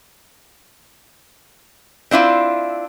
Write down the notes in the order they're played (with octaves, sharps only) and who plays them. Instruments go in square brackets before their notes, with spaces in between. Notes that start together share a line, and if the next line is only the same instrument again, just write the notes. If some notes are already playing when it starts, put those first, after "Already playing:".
[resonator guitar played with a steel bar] C4 D4 E4 F4